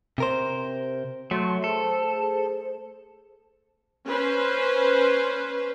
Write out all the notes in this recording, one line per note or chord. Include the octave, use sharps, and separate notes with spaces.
C3 A#4 C5
F#3 A3 F#4 C6
G#4 A4 C5
C#4 B4 C5